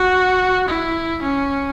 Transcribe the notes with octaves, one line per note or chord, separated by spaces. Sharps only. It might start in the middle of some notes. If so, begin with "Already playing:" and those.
Already playing: F#4
E4
C#4